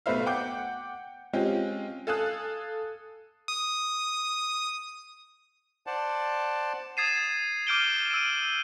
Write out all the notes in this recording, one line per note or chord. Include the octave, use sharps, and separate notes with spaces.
B1 A3 B4 C5 E5 F5
F#5 G5 D6 G6
G#3 C4 C#4 F4 G4
A4 F5 G#5 A5 D#6 F#6
D#6
C5 D5 F#5 A5
D#6 G#6 A6 C7 D#7 E7
D6 F6 G6 D7 D#7 G7
E6 D#7